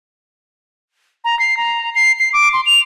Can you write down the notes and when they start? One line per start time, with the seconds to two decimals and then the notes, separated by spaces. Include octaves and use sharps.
1.24 A#5
1.39 C7
1.57 A#5
1.95 C7
2.19 C7
2.33 D6
2.53 C6
2.66 F7